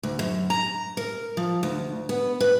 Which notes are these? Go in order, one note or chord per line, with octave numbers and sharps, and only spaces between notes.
D2
F#2
A#5
A#4
F3
D2
B3
B4